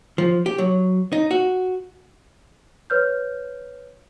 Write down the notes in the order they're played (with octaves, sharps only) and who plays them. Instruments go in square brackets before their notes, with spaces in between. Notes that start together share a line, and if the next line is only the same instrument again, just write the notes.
[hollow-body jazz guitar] F3
G4
F#3
D#4
F#4
[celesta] B4 C#5 F6 G6